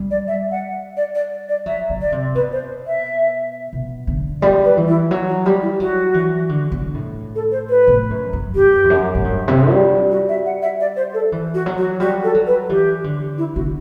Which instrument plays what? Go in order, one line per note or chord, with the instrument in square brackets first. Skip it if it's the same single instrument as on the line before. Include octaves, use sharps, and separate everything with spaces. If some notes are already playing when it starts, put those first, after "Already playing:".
Already playing: [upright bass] G3
[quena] D5
E5
F#5
D5
D5
D5
[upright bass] F#3 [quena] E5
[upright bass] D3
[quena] D5
[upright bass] C3
[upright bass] B2 [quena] B4
[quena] C5
E5
[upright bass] B2
D3
[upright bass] G3 [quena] D5
[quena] B4
[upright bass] E3
[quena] E4
[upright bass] F#3 [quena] F#4
[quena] F#4
[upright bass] G3 [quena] G4
[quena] E4
[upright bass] F#3 [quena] F#4
[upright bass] E3
D3
D3
A2
[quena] A4
C5
B4
[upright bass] A2
F#2
F#2
[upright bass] F#2 [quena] G4
[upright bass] E2
F#2
A2
G2
C3
G3
[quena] F#4
E5
F#5
E5
D5
C5
A4
[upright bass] E3
[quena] F#4
[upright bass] F#3
[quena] F#4
[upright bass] G3 [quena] F#4
[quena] A4
[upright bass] F#3
[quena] B4
[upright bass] E3 [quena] G4
[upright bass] D3
[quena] E4
[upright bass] D3 [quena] F#4